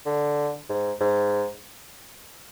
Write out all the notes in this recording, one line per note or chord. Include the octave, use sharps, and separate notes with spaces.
D3
G#2
G#2